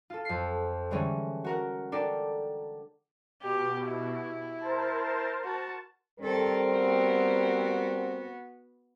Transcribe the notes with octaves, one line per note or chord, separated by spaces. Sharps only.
F4 A4
F2 C7
D3 E3 G3 G#3 C#4
F#4 A#4 F#5
D4 A4 A#4 D5 G5
B2 G4
E4
A#4 C5 A5
F#4 A5
D#3 G3 C4 A4 A#4
B3 F#4